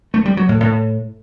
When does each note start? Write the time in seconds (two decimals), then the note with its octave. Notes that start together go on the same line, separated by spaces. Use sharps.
0.14 A3
0.25 G3
0.37 F#3
0.49 A2
0.60 A2